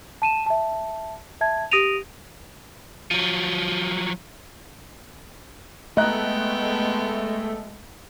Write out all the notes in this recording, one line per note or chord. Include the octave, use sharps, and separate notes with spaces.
A5 D#7 E7
E5 A5
E5 A5 G#6
G4 D#6 A#6 D7 D#7 F7
F3 F#3
G#3 A3 B3 D#5 G5 A#5 F#6